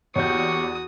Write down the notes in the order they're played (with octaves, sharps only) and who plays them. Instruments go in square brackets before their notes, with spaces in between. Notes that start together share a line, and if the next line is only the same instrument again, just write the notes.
[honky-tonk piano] E2 D5 G6 [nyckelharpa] F#4 D#6 [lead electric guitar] G4 C#5 [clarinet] C#6